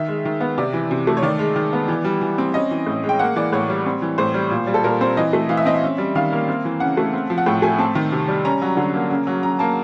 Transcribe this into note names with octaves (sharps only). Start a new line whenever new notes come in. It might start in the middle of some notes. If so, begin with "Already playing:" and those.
Already playing: D#3 E5
G#3
D#3
B3
C3 D5
E3
C3
A3
C#5
D#3 D5
G#3
D#3
B3
E3
G3
E3
C4
C#4 D#5
E3
A2
G#3
G5
A#3 F#5
E3 D5
A2 C#5
G3
C4
E3
A2 C5
G3
A#2
G3
A4
A#2 A#4
C4 C5
E3 D#5
A3
E3 F5
E5
C4 D#5
E5
C#4
G3
D#3 F5
A#3
C4
E3
C#3 F#5
A3
C4
F3
F#5
A2 G5
A3 G#5
C4 A5
D#3
C3
G3
C#4 A#5
F#3
D3
A#3
C#3
F#3
C#3 A#5
A#3 A5